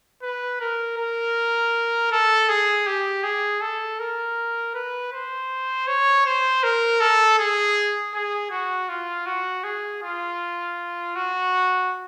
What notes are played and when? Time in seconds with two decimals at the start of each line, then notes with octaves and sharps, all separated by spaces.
0.23 B4
0.60 A#4
0.97 A#4
2.11 A4
2.48 G#4
2.86 G4
3.23 G#4
3.61 A4
3.99 A#4
4.74 B4
5.13 C5
5.87 C#5
6.25 C5
6.63 A#4
7.01 A4
7.38 G#4
8.14 G#4
8.51 F#4
8.89 F4
9.26 F#4
9.64 G#4
10.03 F4
11.15 F#4